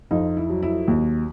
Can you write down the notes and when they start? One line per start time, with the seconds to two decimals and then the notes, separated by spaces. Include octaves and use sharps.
0.11 F2 D#4 F4
0.37 E4
0.50 F#3
0.63 E4
0.88 D#2